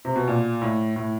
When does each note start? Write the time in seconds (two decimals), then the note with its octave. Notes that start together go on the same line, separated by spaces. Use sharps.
0.05 C3
0.16 B2
0.28 A#2
0.62 A2
0.96 A2